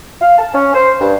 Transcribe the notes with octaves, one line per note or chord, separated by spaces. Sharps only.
F5
A5
C#4
C5
G2